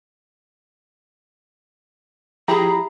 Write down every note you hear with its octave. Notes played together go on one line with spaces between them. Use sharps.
F3 E4 G4 G#4 A#5 B5